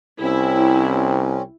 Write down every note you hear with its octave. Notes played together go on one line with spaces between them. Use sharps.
C2 C4 C#4 E4